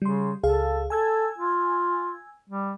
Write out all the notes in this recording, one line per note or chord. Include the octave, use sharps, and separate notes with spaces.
C#3 G3 C6
C#2 G#4 A4 F5
A4 G#5 E6 G#6
F4
G3